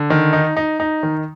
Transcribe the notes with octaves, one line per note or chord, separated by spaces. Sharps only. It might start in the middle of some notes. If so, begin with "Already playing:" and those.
Already playing: D3
D#3
D#4
D#4
D#4
D#3